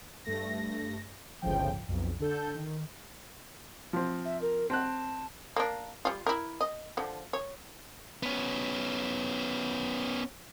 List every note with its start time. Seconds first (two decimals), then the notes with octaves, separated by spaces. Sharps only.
0.25 G2 A3 A#6
1.42 G1 C#2 A2 C#3 F3 G5
1.89 B1 F2
2.20 D3 A4 G6
2.54 D#3
3.93 F3 C4
4.25 E5
4.41 A#4
4.70 C4 A5 F#6
5.56 A#3 D4
6.05 G3 F4
6.26 E4 A#4
6.61 D#5
6.97 D3 F3
7.33 C#5
8.23 B3 C#4